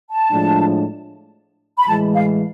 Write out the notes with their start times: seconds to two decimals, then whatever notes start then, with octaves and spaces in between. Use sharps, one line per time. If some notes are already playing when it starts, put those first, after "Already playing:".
0.10 A5
0.30 A2 F3 G#3 D4
1.78 B5
1.87 A2 E3 G#3 A5
2.14 F5